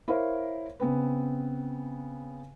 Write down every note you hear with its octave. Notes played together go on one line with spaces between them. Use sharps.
E4 A#4 C5 C#5 F5
C#3 B3 C4 B4